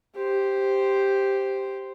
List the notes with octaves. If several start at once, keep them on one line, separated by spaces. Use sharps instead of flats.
G4 C5